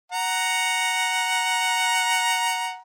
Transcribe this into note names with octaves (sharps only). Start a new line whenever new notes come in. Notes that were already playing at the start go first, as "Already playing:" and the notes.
F#5 A#5